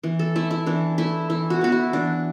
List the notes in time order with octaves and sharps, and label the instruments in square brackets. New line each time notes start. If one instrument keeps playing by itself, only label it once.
[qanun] E3
A4
A3 E4
E4
E3 D4
A3 E4
E3 E4
F#4
B3 F#4
E4
E3 D4